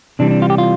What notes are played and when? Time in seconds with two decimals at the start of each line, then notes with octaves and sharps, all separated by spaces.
0.19 C3 E3 G3 D4
0.31 D4
0.42 F4
0.50 G4
0.58 F4